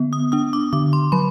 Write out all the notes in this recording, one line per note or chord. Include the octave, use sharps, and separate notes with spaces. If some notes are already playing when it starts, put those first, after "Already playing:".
Already playing: D3 B3
D#6
D4 D#6
D6
D3 D6
C6
F#3 B5